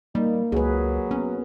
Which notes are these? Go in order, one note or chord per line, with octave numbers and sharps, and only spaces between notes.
G3 A#3 D#4
C#2 F#3 G#4 B4
B3 C#4